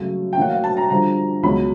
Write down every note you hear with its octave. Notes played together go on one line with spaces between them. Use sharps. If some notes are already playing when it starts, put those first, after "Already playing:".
Already playing: F#2 C#3 F#3 A3
G5
A2 F#3 A#3 F#5
F5
A5
A#5
G2 D3 F3 A#5
C#2 B2 F#3 B5